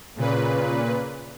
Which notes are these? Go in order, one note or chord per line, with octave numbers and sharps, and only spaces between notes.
A#2 C#3 B4